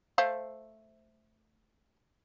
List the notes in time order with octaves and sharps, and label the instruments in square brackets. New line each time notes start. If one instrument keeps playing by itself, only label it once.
[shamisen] A3 C5 F5